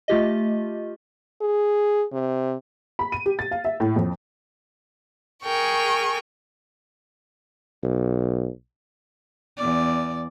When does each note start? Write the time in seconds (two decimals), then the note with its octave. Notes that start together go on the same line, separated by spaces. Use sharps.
0.08 A3 F4 G4 D#5
1.41 G#4
2.13 C3
2.99 B5
3.12 D#7
3.26 G4
3.39 A6
3.51 F5
3.65 E5
3.80 A2
3.96 F2
5.43 G#4 A#4 G5 C#6
7.84 B1
9.57 E2 D5